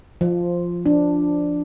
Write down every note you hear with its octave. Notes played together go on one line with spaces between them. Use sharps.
F3
D4